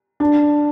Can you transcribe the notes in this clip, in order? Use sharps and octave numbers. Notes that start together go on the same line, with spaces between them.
D4